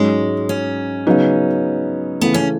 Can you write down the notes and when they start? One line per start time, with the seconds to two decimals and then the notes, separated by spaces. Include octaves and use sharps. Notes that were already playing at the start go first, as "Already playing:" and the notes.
Already playing: G#2 F#3 G#3 C#4
0.49 C#4
1.07 C#3 F#3 B3 D#4
2.21 C#3 E3 A3 B3
2.34 C#4